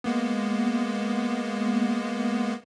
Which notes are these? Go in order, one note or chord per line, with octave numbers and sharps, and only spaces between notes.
G#3 A#3 B3